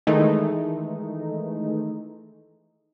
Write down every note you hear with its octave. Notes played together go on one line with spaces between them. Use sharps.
D#3 E3 G#3 A3 D#4